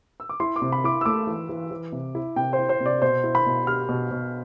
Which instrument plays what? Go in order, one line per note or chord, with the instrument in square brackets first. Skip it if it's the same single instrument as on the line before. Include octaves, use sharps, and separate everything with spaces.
[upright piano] E6
D6
[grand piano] E4 [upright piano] C6
[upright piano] D6
[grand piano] C3
[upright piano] B5
[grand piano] E4 [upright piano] D6
[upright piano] C6
E6
[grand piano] A3 [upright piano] D6
[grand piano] E3
E3
E3
C3
E4
[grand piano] C3 [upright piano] G5
[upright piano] C5
[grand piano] E4
[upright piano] C5
[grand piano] C3
[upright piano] D5
[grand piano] B2 [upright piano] C5
[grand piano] E4
[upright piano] B5
[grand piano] B2
[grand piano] G4 [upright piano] F6
[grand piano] B2
B2